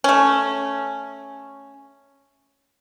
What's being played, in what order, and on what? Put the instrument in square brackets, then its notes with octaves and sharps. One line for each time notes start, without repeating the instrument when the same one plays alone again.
[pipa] A3 C#4